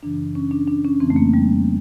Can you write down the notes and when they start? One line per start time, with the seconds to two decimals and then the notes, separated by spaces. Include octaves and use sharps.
0.03 F#2 C#3 E3 D4
0.35 C#4
0.51 D4
0.68 D4
0.85 C#4
1.00 F2 C#3 E3 C4
1.10 A3
1.16 A#3
1.34 G3